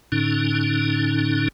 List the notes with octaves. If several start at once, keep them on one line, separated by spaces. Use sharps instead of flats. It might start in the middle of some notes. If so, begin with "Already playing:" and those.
A2 D3 C#4 D#4